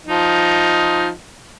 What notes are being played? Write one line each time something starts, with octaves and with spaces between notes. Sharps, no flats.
F3 D#4